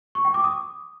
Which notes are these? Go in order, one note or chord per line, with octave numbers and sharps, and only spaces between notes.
C#6
G5
D6
D#6